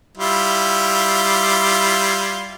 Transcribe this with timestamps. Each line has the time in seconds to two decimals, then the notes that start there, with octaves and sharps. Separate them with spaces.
0.17 G3 E4 F4